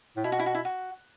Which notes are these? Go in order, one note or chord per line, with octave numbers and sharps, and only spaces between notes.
A2
B2 E4
F#4
E4
F#4
E4
F#4